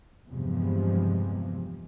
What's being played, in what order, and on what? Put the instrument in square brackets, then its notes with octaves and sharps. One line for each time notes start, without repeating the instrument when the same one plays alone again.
[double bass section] E2 G2 C3 F3 G3 G#3